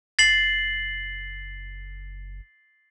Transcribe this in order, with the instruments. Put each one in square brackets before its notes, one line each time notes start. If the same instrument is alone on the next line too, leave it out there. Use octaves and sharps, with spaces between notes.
[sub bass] F#1 [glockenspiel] A6 C7 F#7